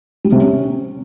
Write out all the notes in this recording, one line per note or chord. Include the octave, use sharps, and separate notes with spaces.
G3
C3
C#4